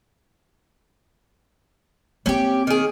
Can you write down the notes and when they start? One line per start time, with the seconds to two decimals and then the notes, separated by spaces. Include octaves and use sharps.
2.26 A#3 C4 C#4 G4
2.67 D#3 G#4